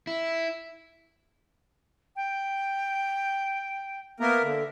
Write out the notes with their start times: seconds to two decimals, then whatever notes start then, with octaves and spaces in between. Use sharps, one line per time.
0.07 E4
2.16 G5
4.20 A#3 B3 A#4 E5
4.43 D3